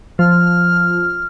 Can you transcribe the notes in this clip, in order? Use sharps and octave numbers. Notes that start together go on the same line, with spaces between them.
F3 F6